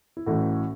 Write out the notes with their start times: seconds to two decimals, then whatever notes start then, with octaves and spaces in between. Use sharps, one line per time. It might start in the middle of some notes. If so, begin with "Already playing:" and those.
0.17 E4
0.26 A1 A2 E3 F#4